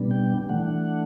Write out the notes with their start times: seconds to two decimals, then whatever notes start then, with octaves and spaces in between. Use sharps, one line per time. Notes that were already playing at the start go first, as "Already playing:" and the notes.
Already playing: B2 G3 B3 D4
0.11 G5
0.49 E3 A3 D4 F#5